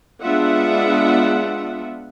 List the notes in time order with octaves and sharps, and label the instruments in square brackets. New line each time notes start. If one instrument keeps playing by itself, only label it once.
[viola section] G#3 B3 D4 F4 E5 F#5